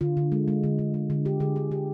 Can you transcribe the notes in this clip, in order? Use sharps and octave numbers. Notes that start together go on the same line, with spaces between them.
D3 F4
D3
G#3
G#3
D3
D3
G#3
D3
D3 G4
D3 G#4
D3 G#4
D3 G4